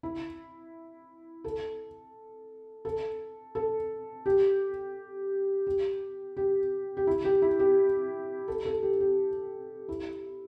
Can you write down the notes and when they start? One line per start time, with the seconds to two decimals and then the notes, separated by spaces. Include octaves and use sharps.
0.03 E4
1.44 A4
2.85 A4
3.55 A4
4.26 G4
5.67 G4
6.37 G4
6.97 G4
7.07 E4
7.25 G4
7.42 E4
7.59 G4
8.48 A4
8.65 A4
8.83 G4
9.00 G4
9.89 E4